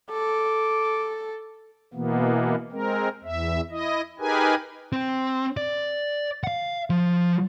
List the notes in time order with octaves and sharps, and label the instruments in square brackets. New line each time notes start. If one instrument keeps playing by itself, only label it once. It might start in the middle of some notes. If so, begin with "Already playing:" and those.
[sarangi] A4 [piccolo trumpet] D6
[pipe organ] B2 E3 A#3 B3
G#3 C4 A#4
E2 E5
E4 D#5
D#4 G4 G#4 A#4 B4 G#5
[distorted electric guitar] C4
D5
F5 F#5
F3